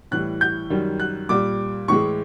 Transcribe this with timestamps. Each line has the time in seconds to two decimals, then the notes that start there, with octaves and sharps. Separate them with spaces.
0.11 A2 E3 G3 F#6
0.41 G6
0.70 F#2 D#3 G3
1.00 F#6
1.29 A#2 G3 D6
1.88 A2 E3 G#3 C#6